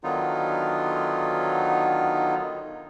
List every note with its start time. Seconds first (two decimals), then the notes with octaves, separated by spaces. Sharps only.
0.04 D3 D#3 F#3 B3 D#4 F4